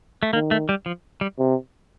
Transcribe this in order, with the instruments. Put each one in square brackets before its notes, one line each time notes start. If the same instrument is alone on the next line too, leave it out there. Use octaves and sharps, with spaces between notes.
[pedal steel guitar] A3
[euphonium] D#3 [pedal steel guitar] A#3
[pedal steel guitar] A3
G3
F3
G3
[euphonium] C3